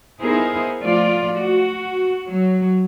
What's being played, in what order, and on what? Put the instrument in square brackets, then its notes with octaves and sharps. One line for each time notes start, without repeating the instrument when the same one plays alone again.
[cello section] B3 D#4 E4 G#4 A#4 C5
F3 A3 F4 D5
F#4
F#3